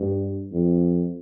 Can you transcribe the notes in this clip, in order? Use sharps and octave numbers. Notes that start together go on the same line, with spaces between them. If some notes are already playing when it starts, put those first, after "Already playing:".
Already playing: G2
F2